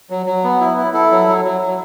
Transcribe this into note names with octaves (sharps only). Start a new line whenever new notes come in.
F#3
F#3
B3
E4
E4
E4 A4
F#3
F#3
F#3
F#3